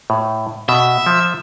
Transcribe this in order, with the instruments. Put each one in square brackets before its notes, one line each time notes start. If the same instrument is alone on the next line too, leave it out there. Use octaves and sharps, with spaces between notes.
[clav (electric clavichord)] A2
[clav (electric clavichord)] B2 [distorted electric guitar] E5
[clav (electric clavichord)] F3